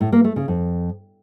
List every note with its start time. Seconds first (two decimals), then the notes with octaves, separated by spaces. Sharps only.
0.01 A2
0.12 A#3
0.24 A3
0.36 C#3
0.48 F2